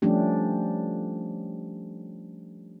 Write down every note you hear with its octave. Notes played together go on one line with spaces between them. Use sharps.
F3 G3 A3 C#4 D4 G4